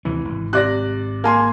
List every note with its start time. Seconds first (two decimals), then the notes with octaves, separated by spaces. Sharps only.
0.05 D#2 C3 E3 C#4
0.25 G#1
0.53 C3 D5 F#6 A#6
1.24 A#3 G#5 C6